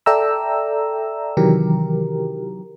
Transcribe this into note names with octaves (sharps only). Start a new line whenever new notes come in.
A4 D5 E5 G5 A#5 E6
C3 D#3 E3 F#3 G4 A#4